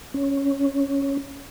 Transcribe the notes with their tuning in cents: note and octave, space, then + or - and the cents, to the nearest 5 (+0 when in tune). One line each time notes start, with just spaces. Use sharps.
C#4 +0